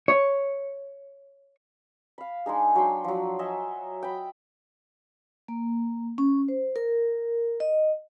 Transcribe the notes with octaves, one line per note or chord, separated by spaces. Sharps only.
C#5
F5 B5
G#3 D4 D#4 G#4
F#3 D4 G5 C6
F3 F#3
D#5 E5 F#5 G#5
G5 B5
A#3
C#4
C5
A#4
D#5